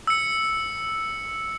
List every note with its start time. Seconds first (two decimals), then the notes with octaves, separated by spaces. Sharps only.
0.07 E6 C#7